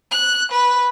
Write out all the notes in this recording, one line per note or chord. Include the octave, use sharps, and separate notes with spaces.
F#6
B4